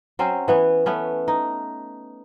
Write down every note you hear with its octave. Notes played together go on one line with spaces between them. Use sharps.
F#3 C4 C#4 C5
E3 B3 C#5
A3 B3 C#4
D#4